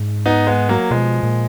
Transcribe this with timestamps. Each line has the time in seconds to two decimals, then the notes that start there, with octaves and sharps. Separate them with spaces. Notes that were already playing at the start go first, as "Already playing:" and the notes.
Already playing: G#2
0.26 B3 D#4
0.47 G#3 B3
0.69 F#3 A#3
0.90 B2 F3 G#3
1.23 A#2